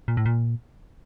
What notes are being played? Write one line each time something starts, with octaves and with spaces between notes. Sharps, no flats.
A#2
A2
A#2